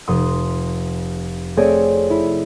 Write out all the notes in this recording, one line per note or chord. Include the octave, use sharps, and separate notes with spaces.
F1 C6 D#6
A3 C4 G#4 C#5 D5
E4